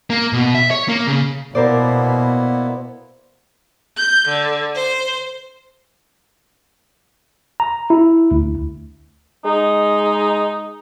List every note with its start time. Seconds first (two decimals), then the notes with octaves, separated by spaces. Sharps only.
0.10 A#3
0.33 B2
0.55 E5
0.71 C#5
0.89 A#3
1.07 C#3
1.55 B2 A#3 B3 E4 A#4 C5 D5
3.97 G6
4.28 D3
4.76 C5
7.60 A#5
7.90 E4
8.31 D2
9.45 G#3 D#4